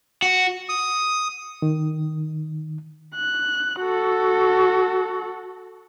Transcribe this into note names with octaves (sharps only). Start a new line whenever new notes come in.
F#4
D#6
D#3
F#6
F#4 A4